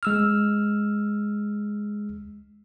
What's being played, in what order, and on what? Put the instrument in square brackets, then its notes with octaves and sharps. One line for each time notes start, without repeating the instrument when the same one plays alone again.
[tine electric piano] G#3 E6 F6